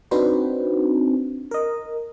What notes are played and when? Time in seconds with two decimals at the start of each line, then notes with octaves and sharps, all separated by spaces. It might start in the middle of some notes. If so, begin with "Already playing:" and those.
0.11 C4 D4 D#4 F#4 B4 C5
1.51 A#4 D#5